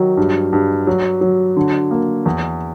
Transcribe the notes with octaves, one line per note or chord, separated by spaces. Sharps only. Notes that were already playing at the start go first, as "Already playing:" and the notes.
Already playing: D#3 F#3
G2
G2
F#3
F#3
D3
A#3
E2